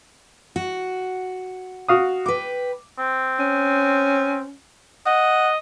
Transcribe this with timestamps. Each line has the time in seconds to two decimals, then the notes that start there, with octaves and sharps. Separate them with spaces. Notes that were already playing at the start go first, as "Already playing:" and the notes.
0.56 F#4
1.88 F#4 F5 D#6
2.26 B4 G5 D6
2.99 C4
3.40 C#4
5.06 D#5 F#5